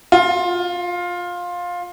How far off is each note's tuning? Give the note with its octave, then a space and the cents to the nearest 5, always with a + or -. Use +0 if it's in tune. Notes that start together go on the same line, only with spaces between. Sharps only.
F4 +15